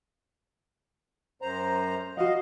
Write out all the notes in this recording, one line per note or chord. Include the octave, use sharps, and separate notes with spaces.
F#2 C5 A#5
F#4 D#5 F5 F#5